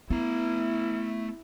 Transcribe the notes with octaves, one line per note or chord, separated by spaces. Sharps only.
A3 B3 E4 A#5